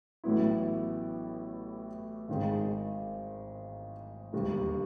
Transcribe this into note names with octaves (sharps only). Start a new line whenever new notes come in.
A1 A2 F#3 B3 E4
G#1 G#2 D#3 G#3
E1 D#2 D3 G3